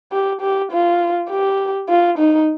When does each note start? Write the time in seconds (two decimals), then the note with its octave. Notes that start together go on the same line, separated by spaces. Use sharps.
0.12 G4
0.41 G4
0.71 F4
1.30 G4
1.89 F4
2.18 D#4